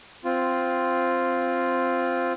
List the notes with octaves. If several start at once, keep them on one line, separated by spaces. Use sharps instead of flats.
C4 F4